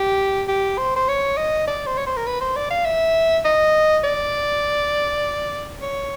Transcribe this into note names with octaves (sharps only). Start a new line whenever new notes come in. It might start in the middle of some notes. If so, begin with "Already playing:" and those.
Already playing: G4
G4
C5
C5
C#5
D#5
D5
C5
C#5
C5
A#4
B4
C5
D5
F5
E5
D#5
D5
C#5